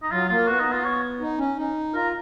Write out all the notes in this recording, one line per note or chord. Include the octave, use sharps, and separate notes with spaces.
D#4
F#3 F4
A#3 F4
B3 F#4
D#4
B3
F4
C#5
D#4
C#4
D#4
F4 A#4